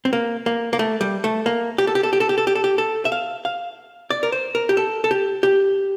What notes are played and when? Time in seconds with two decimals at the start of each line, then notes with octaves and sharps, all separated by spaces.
0.05 C4
0.13 A#3
0.46 A#3
0.73 A#3
0.79 A3
1.01 G3
1.24 A3
1.46 A#3
1.78 G4
1.87 A4
1.95 G4
2.03 A4
2.13 G4
2.20 A4
2.29 G4
2.38 A4
2.47 G4
2.55 A4
2.64 G4
2.78 A4
3.05 E5
3.12 F5
3.45 F5
4.10 D5
4.23 A#4
4.32 C5
4.55 A#4
4.69 G4
4.77 A4
5.04 A4
5.11 G4
5.43 G4